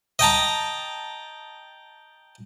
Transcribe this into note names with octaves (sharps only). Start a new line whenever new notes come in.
D#5 G5 A5 A#5